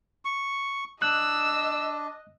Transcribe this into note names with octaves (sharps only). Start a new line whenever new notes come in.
C#6
D4 D#5 E6 F#6